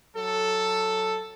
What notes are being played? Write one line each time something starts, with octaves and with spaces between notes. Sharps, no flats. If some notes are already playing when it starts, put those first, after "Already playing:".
F#3 A4